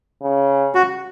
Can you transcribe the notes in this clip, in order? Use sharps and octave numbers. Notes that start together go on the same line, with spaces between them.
C#3
F#4